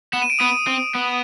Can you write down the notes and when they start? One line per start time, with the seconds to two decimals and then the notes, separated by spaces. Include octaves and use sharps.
0.13 B3 E7
0.22 D#7
0.30 D7
0.39 B3 D#6 D#7
0.67 C4
0.95 B3